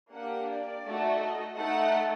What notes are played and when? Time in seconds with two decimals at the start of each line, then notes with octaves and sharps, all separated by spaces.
0.12 A#3 D4 G4 F#5
0.48 D5
0.83 A3 D#4 F#4 A4
1.19 D#5
1.55 A3 D#4 A4 F#5